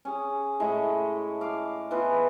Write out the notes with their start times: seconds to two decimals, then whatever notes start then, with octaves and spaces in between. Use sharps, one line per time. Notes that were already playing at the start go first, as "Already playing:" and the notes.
0.05 C#4 G#4
0.60 A2 G#3 A3 E4
1.41 F5 D6
1.91 E3 B3 F4 B4